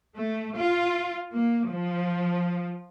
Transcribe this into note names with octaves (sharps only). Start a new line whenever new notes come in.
A3
F4
A#3
F3